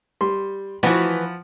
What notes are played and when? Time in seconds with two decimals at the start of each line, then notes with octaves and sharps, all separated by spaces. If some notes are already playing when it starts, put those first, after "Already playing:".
0.21 G3 C6
0.83 E3 F3 F#4 F#5